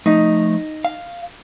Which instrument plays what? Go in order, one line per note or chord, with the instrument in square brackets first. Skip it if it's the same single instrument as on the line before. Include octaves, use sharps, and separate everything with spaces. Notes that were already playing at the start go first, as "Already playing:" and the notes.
[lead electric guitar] F3 A3 [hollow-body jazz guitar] D#4
[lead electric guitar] F5